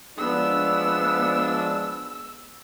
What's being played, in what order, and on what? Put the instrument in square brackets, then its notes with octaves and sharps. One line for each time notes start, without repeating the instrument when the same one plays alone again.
[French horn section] F3 G#3 D4 [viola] B3 [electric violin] E6